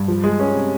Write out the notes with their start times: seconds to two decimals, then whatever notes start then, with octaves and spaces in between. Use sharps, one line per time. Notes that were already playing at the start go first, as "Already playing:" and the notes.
Already playing: G2
0.08 F3
0.24 G#3
0.40 C#4
0.55 C3